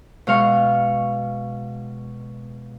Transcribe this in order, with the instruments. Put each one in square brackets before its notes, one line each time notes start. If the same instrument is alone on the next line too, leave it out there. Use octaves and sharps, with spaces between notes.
[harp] B2 G#3 F5 C#6